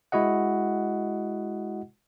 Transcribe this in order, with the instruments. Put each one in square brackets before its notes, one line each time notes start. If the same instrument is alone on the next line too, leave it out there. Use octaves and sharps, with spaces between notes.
[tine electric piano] G#3 E4 F#4 D#5 F#5